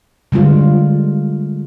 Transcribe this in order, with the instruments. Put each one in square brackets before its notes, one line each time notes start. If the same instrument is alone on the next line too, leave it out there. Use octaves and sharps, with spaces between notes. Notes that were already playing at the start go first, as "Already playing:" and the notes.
[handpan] D3 G3 G#3 F4